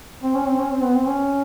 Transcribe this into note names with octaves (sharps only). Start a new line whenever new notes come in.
C4
C#4
C4
C#4
C4
B3
C4
C#4